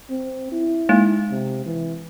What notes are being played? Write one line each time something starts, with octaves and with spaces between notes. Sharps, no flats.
C4
E4
G#3 A#3 D#4
C3
E3